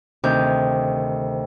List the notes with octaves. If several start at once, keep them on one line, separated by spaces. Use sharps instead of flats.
D2 C3 D#3 G6